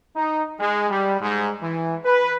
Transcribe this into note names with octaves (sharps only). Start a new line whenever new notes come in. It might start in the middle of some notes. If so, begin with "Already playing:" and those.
D#4
G#3
G3
G#2
E3
B4